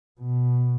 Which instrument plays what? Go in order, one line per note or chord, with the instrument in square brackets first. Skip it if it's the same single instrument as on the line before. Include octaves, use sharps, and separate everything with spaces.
[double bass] B2